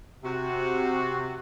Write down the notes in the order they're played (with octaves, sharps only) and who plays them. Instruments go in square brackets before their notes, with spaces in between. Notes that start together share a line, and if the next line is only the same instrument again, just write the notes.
[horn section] C3 F#4